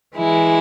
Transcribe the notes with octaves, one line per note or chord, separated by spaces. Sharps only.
E3 G#3 E4